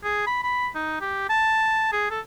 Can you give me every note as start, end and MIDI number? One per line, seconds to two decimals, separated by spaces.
0.04 0.26 68
0.27 0.39 83
0.43 0.69 83
0.75 0.97 63
1.01 1.24 67
1.29 1.88 81
1.93 2.09 68
2.11 2.20 69